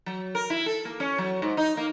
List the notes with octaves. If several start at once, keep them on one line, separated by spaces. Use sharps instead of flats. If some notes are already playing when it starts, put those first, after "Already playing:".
F#3
A#4
E4
A4
A#3
C#4
F#3
G#2
D#4
A#3